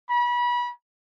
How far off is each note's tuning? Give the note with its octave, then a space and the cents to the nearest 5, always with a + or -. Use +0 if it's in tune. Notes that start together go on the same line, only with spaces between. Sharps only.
B5 -30